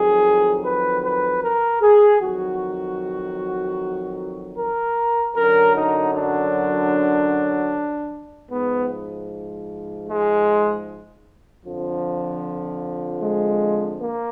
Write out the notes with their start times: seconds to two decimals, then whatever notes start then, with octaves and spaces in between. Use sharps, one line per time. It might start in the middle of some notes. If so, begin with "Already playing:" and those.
Already playing: F2 D#3 F#3 G#4
0.64 B4
1.03 B4
1.42 A#4
1.81 G#4
2.20 F2 D#3 F#3 F#4
4.57 A#4
5.35 F#2 D3 F#3 A#4
5.75 D#4
6.14 D4
8.50 G#2 F3 B3
10.07 G#3
11.65 F2 D3 F3
13.22 G#3
14.01 A#3